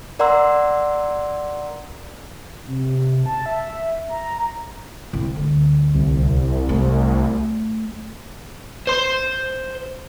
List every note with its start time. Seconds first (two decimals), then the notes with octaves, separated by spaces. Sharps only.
0.19 A#4 D5 F#5 A#5 C6 E6
2.67 C3
3.26 A5
3.46 E5
4.09 A#5
5.13 C2
5.36 D2 G3
5.94 C2
6.69 A3
8.87 C5 C6